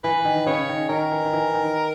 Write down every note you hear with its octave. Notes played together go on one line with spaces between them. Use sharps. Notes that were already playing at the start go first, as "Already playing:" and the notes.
E3 B4
D#3
C#3 C#5
D#3
D#3 A#4
E3
D#3
E3
D#3